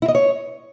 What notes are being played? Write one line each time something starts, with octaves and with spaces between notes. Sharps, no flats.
E4
D#5
C#5